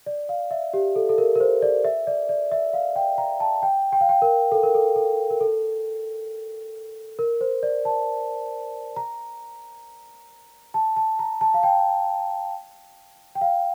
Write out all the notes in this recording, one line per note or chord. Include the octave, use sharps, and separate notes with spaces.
D5
F5
E5
G4
A4
A4
A#4
A#4
C5
D5
E5
D5
D5
E5
F5
G5
A#5
A5
G5
G5
F5
G5
A#4
A4
A#4
A4
A4
A#4
A4
A#4
C5
D5
A5
A#5
A5
A5
A#5
A5
F5
G5
G5
F5